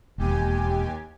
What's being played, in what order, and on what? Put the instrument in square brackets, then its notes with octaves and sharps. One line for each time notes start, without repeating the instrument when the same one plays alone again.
[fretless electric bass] E1 [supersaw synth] D#2 G4 G#5